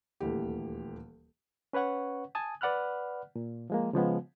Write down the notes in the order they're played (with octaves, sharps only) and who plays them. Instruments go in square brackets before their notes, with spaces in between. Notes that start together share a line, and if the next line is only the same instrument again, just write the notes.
[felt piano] D#1 D2 E3 G4
[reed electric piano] C#4 B4 C#5 F#5 C#6
G#5 A5 D#6
B4 D5 F#5 B5 F6 F#6
A#2
F3 G#3 A#3
C#3 F3 G#3 B3